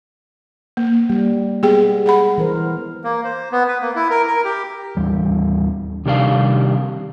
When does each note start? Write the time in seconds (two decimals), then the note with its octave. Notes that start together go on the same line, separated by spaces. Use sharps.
0.77 A#3
1.09 G3 A#3
1.63 G#3 B3 G4 G#4 G5
2.06 G#4 F#5 B5
2.38 E3 A#4 C5
3.04 A#3
3.24 C5
3.52 B3
3.68 B4
3.81 A#3
3.96 E4
4.10 A#4
4.27 A#4
4.44 G4
4.97 D#2 E3 G3
6.06 C3 D#3 G3 D4 G4 F5